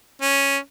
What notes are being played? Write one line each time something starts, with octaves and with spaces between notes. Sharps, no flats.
C#4